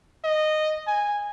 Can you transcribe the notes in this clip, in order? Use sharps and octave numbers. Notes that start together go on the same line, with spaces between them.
D#5
G#5